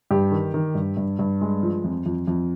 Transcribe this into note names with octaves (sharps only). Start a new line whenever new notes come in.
G2 G4
D#3
D#3
G2
G2
G2
G#3
F3
F2
F2
F2